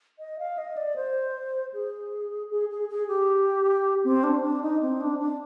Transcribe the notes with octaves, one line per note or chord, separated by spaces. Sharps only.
D#5
F5
D#5
D5
C5
G#4
G#4
G#4
G#4
G4
C4
D4
D4
D#4
C4
D4
D4